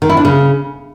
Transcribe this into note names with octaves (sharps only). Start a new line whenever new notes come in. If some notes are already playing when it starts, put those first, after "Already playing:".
D#3
E4
D4
C#3